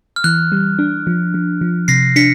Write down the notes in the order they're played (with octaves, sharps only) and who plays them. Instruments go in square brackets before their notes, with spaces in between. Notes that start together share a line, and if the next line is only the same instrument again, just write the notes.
[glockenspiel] F6
[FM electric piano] E3 [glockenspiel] F#6
[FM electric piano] G3
D4
F3
F3
F3
[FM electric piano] C3 [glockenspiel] A#6 C7
[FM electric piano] D4 [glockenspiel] B6 C#7